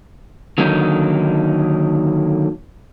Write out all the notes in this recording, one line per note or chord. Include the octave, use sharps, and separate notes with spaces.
D3 D#3 F#3 A#3 D#4